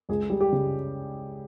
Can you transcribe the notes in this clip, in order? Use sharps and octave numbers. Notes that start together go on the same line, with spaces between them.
C#2 G#4
G3
G4
C#3